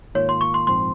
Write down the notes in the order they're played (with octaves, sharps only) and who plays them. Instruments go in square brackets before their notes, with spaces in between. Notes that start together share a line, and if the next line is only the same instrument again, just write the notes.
[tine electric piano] G#2 D#3 A#3 F4 [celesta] C#5
[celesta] C6
C#6
C6
[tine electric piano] A#1 G#2 F3 C4 [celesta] C6